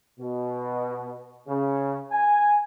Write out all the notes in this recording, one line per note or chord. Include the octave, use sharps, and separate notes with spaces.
B2
C#3
G#5